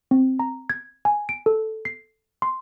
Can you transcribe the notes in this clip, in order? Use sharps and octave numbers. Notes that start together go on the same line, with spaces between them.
C4
A#5
G#6
G#5
D7
A4
C7
C6